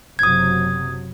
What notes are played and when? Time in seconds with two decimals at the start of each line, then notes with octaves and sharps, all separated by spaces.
0.19 F#1 C3 F#3 D#6 G#6